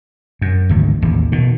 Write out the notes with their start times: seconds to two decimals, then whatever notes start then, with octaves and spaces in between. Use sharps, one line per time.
0.42 F#2
0.69 G#1 D2
1.02 A1 D#2
1.32 B2 D#3